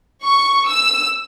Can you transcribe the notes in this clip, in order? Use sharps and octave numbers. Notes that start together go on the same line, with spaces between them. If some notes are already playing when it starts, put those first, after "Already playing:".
C#6
E6